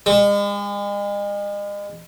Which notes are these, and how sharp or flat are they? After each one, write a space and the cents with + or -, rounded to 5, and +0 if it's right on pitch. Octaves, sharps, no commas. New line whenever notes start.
G#3 -40